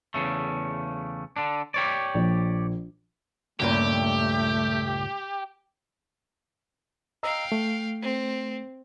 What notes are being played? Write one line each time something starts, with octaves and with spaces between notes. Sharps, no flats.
E2 C#3 A3
D3 D4
G4 C#5 D5
A#1
C#2 G2 A#2 A3 G4
D#5 F5 G5 A#5 E6
A3
C4